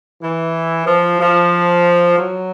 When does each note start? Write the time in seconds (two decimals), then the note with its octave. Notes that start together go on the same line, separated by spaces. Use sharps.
0.21 E3
0.86 F3
1.20 F3
2.18 F#3